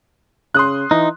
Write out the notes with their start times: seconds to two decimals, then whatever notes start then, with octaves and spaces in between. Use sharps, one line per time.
0.54 C#3 C6 D#6 F#6
0.91 E3 D#4